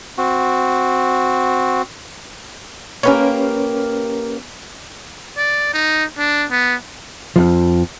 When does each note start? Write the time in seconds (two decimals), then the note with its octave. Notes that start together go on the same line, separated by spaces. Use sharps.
0.18 C4 F#4
3.03 A#3 C#4 G4 A#4 B4 C#5
5.38 D5
5.74 D#4
6.18 D4
6.51 B3
7.36 F2 F3